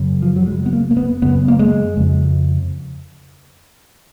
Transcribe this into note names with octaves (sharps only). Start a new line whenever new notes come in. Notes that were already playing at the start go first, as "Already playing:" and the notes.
Already playing: F#2 C#3
F3
F#3
F#2 C#3 G#3
B3
A#3
A#3
B3
F#2 C#3 B3
A#3
G#3
F2 C#3